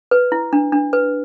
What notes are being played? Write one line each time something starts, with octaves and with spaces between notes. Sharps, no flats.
B4
E4
D4
D4
B4